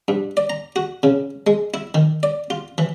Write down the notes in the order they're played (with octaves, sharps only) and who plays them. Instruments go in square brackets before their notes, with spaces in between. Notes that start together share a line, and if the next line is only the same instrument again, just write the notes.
[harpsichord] G2
D5
A#5
F#4
C#3
G#3
E4
D#3
D5
F4
E3